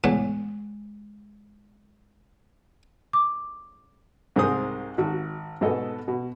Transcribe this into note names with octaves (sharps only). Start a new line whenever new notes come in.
E2 A2 G#3 F#5
D6
C2 G#2 G#4 A#4 C5 D#6
G#1 F#4
G#2 B2 B3 A4 D#5
B2